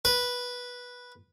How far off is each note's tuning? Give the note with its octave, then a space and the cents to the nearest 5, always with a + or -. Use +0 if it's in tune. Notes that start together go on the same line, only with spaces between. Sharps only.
B4 -10